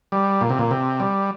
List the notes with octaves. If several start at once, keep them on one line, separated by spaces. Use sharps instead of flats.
G3
A#2
C3
A#2
C3
G3